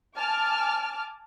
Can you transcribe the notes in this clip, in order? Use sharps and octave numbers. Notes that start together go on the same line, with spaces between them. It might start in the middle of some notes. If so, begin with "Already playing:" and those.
G#5 A5 D6 F6